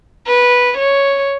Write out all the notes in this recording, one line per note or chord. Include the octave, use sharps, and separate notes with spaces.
B4
C#5